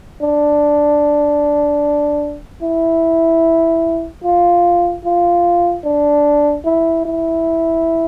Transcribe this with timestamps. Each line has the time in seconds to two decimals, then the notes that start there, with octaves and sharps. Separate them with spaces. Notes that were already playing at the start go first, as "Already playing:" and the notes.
0.22 D4
2.62 E4
4.24 F4
5.05 F4
5.84 D4
6.65 E4
7.05 E4